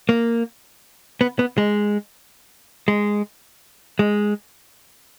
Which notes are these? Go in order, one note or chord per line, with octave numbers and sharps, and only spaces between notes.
A#3
B3
B3
G#3
G#3
G#3